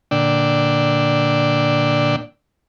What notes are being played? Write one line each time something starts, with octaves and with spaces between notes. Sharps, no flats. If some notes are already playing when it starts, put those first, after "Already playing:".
A#2 D3 D4 D5 G5 E6